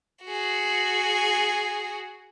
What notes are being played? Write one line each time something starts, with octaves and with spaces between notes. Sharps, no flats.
F#4 G#4